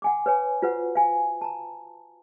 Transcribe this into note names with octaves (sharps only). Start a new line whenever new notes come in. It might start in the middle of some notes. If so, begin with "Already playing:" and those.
F#5 G#5 D6
B4 C#5 G#5
F4 F#4 B4 C5 F#5
F5 G#5
A5 A#5